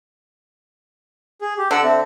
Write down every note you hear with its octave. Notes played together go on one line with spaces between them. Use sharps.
G#4
G4
D3 A4 F#5 E6
C4 E5